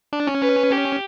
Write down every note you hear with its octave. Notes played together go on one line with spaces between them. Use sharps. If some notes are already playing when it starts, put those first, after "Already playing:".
D4
C#4
B4
G4